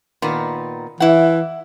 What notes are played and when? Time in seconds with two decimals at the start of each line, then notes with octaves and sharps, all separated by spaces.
0.22 A#2 D#3 B3
1.00 E3 E4 F#5